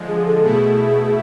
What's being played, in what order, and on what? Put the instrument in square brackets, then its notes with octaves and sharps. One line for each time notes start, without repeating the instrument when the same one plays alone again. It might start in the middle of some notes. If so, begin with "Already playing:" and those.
Already playing: [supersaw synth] D3 F3 G#3
[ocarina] G#4
A4
[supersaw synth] B2 A3 E4 [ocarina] G#4